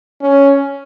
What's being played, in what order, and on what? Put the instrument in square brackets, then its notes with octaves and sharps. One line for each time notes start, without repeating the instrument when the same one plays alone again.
[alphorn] C#4